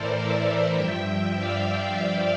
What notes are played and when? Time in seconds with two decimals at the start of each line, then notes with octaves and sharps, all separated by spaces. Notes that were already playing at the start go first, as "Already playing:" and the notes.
Already playing: A2 E3 A4 A#4 C5 D5
0.11 C5 E5
0.74 G2 F3 E5 G5
1.36 D5 F5